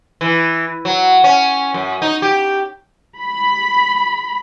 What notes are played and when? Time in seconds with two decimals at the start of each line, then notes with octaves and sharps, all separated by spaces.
0.21 E3
0.85 F#3
1.24 C#4
1.74 F#2
2.02 D#4
2.22 G4
3.20 B5